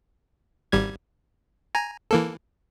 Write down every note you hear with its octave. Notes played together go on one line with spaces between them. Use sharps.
G#1 G3 G#6
G#5 A#5
E3 A#3 A4